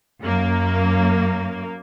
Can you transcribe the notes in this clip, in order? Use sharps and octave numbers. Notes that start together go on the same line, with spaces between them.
F#2 A#3